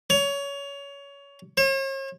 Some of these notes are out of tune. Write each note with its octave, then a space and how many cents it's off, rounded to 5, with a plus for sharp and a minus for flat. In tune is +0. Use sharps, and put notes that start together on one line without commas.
C#5 +20
C#5 -45